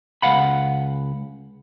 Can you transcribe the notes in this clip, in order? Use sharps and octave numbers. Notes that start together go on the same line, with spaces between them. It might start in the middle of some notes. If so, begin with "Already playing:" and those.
C#2 F5 F#5 B5